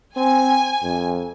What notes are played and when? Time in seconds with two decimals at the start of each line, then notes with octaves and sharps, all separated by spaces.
0.17 C4 G#5
0.83 F2